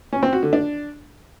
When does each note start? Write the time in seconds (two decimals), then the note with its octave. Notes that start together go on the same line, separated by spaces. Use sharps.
0.13 C#4
0.23 C4
0.33 F#4
0.43 D3
0.53 D4